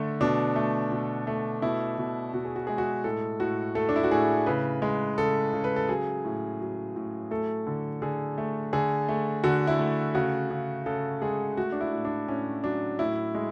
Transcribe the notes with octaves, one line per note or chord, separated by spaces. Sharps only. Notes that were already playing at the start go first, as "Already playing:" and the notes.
Already playing: D3 A3
B2 D4
A3
B2
A3
B2 E4
B2
B2 F#4
G#4
F#4
G#3 G#4
F#4
A2 A4
A2 F#4
A3 A4
D4
E4
F#4
A2 G#4
C#3 B4
G#3
C#3 A4
C#3
B4
A4
F#3 G#4
A2
F#3
A2
A3 A4
D3
D3 G#4
A3
D3 G#4
A3
D3 F#4
E4
A3
C#3 F#4
C#3
C#3 A4
G#3 G#4
A3 F#4
D4
E4
A2
D4
A2 C#4
F#3 D4
A2 E4
G#3